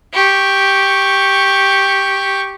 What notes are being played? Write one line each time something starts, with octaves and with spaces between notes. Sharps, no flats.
G4 C#6